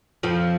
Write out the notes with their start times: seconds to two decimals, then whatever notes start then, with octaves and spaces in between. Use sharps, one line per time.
0.23 F2 F3